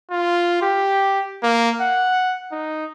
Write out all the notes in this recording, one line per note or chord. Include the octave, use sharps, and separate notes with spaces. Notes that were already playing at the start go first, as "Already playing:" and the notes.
F4
G4
A#3
F#5
D#4